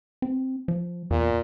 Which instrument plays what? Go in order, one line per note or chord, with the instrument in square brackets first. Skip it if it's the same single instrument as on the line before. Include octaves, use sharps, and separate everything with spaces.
[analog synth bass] C4
F3
[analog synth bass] E2 [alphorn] A#2